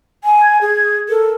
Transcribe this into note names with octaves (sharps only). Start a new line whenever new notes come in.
G#5
G#6
G#4
A4 A#4